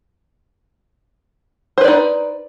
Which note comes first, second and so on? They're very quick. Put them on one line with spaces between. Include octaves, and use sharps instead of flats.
C5 B4 D5 D#4